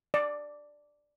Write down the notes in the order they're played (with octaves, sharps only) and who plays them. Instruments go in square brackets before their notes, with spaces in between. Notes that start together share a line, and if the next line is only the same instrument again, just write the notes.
[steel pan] D5